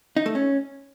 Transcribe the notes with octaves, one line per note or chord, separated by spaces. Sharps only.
D#4
A3
C#4